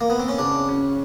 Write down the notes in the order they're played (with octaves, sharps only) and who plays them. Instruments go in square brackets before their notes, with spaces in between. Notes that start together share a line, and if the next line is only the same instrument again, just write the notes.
[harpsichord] A#3
B3
C4
C#4
[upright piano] C#3 [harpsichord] D4
[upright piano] C#4